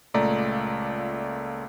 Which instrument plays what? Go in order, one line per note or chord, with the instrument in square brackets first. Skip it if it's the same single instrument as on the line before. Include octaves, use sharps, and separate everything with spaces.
[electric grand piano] C#2 A#2 A3 D5 A#5